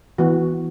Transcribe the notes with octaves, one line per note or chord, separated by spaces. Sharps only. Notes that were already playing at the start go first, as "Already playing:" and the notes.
E3 B3 F#4